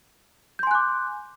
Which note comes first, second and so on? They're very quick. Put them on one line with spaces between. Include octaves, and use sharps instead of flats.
G6 C6 G#5 F#6 D6